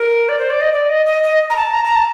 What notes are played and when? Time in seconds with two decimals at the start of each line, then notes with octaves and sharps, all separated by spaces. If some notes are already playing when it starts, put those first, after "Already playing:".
Already playing: A#4
0.29 D5
0.39 C5
0.50 D5
0.61 D#5
0.73 D5
0.89 D#5
1.06 D#5
1.23 D#5
1.50 A#5
1.57 A5
1.73 A#5
1.85 A#5
1.96 A5